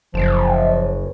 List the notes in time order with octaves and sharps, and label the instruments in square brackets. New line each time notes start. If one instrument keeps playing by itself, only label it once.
[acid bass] F#1 [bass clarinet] F3